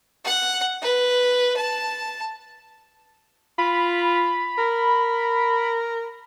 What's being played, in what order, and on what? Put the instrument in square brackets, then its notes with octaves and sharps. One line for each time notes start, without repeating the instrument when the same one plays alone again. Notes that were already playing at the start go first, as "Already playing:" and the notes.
[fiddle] F#5
B4
A5
[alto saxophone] F4 [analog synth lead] B5
[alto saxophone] A#4